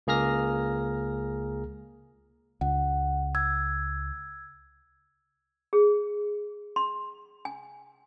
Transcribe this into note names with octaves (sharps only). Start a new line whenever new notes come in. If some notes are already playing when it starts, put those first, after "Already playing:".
C#2 A#3 G#4 A#5 F6 A#6
C#2 F#5
E6 G#6
G#4
C6
G#5